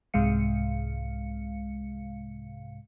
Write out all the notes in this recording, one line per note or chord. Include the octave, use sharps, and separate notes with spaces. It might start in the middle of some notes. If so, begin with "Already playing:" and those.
C2 G#2 C3 G#3 F5 C#7